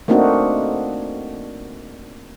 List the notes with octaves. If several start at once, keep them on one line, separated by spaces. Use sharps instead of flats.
A3 A#3 C4 D4 D#4 F#4